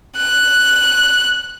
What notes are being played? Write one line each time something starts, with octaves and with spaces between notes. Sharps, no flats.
F#6